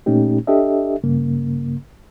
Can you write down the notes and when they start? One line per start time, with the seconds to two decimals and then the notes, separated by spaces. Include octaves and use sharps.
0.06 A#2 A3 C#4 D#4 G4
0.47 D4 G4 A4 D#5 E5
1.03 G2 C#3 A#3